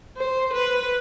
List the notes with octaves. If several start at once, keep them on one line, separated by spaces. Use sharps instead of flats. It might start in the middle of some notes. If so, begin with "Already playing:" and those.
C5
B4